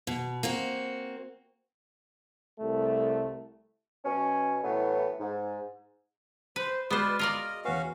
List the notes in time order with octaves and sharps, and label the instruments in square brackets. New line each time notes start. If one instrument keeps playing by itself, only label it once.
[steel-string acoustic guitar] B2
A#3 C4 F#4
[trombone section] C2 A3
[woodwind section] B2 F#3 C#4
A2 E3 F#3 B3
G#2
[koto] B4 [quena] C5
[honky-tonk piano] G#3 F#4 [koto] B3 C5 [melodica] B4 D5 [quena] F6
[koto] F4 A#4 D5 [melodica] D#5
[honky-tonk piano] E2 B4 [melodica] C#4 F#4 F5